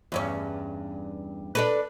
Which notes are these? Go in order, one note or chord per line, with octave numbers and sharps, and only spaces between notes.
E2 G2 C#4
D4 A4 B4